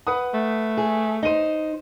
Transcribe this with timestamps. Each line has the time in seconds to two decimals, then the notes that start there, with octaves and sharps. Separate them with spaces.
0.07 B4 F#5 D#6
0.34 A3
0.77 G#4
1.23 D#4 C5 D#5 D#7